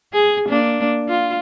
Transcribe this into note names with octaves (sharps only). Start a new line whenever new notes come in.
G#4
A#3 D4
F4